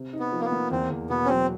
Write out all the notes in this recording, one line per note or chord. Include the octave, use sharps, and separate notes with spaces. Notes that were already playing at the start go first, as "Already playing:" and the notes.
Already playing: C3
D#4
B3
F3
A#3
B3
A#3
E2 C4
E2
B2 B3
C#4
F#3 C4